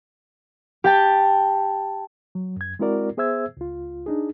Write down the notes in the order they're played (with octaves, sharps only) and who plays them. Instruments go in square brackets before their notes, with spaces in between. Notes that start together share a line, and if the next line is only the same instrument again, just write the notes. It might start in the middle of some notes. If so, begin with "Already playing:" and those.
[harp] G4 G5 A5
[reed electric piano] F#3
F#2 G#6
G#3 C4 E4 F#4 A#4 D5
B3 G#4 C5 E5 E6 G#6
C#2 F4
D4 D#4 G#4